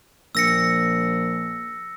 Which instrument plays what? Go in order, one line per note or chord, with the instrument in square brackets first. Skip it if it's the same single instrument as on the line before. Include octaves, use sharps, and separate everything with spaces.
[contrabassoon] A#1 [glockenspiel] E6 A#6 C#7